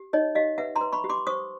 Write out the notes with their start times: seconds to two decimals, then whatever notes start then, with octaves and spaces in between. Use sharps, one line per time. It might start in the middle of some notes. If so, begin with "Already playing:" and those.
Already playing: G4
0.13 D#4 C#5 D#5
0.35 G4 D#5 F5
0.58 B4 E5 F#5
0.76 A#5 C6
0.81 B4
0.92 B5 C#6
1.04 G4
1.09 C6 D6
1.27 C5 C#6 D#6